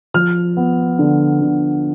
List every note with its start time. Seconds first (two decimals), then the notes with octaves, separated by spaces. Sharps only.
0.14 F3 F6
0.57 B3
0.99 D3
1.41 D3